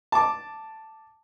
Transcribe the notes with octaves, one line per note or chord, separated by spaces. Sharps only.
A5 D6